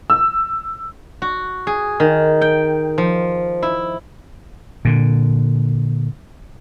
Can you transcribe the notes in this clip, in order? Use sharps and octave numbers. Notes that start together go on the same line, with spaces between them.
E6
F#4
G#4
D#3
G5
F3
E4
A#2 D3